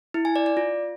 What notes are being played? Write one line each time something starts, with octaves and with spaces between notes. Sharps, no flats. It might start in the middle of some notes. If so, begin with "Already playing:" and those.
E4
G#5
D5
D5
F4